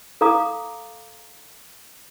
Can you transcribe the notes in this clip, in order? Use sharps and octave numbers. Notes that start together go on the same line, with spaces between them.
A4 F5 A#5 D6 D#6